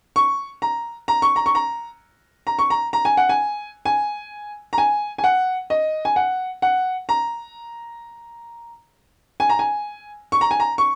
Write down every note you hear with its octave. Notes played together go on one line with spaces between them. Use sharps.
C#6
A#5
A#5
C#6
A#5
C#6
A#5
A#5
C#6
A#5
A#5
G#5
F#5
G#5
G#5
A#5
G#5
G#5
F#5
D#5
G#5
F#5
F#5
A#5
G#5
A#5
G#5
C#6
A#5
G#5
A#5
C#6